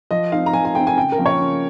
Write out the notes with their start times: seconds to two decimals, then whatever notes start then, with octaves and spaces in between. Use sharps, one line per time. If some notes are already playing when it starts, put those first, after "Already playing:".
0.11 F3 D#5
0.32 C4 D#4 F5
0.46 A#5
0.53 F3 G#5
0.65 G#5
0.75 C4 D#4 G5
0.87 G#5
0.97 C#3 G5
1.12 A#4
1.18 F3 A#3 C#4
1.26 C#5
1.40 C#3